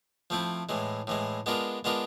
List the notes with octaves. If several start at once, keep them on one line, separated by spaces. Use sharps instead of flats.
F3 A3 C4 E4
A2 E3 G#3
A2 E3 G#3
G#3 B3 D4 F4 A#4
G#3 B3 D4 F4 A#4